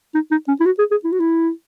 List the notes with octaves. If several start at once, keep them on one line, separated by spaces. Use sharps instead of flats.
D#4
D#4
C#4
E4
F#4
G#4
G#4
E4
F#4
E4